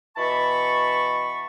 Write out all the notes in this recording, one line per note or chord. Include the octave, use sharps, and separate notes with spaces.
B2 E3 A5 B5 C#6